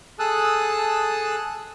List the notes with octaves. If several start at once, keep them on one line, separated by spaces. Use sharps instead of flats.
G#4 A4 A5 D#6 E6 F#6